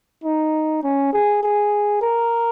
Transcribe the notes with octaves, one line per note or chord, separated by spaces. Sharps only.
D#4
C#4
G#4
G#4
A#4